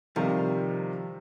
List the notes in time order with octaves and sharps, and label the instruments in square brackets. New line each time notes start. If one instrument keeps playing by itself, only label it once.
[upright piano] C3 D#3 G3 [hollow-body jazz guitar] F3